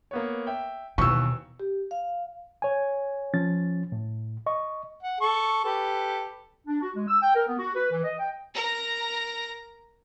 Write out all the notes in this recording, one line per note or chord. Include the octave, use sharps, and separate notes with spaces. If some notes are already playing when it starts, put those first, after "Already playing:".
A#3 B3 C#5
E5 G5
D#2 B2 E3 C#6 E6
G4
F5
C#5 G#5
F3 C#4 A6
A2
D#5 C#6
F#5
A4 C#6
G4 A4 B4
D4
F#4
G#3
E6
G5
A#4
B3
F#4
B4
E3
D#5
G5
A#4 A#5